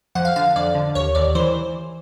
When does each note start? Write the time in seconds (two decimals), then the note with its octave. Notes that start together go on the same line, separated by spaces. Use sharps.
0.15 F2 F#5
0.25 F5
0.36 D3 F5
0.56 F2 D5
0.75 D3
0.95 D#2 C#5
1.15 D#2 D5
1.35 E3 C5